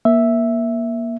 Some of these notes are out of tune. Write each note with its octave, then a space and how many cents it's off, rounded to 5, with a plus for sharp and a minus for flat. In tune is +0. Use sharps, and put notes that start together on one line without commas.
A#3 +25 E5 +0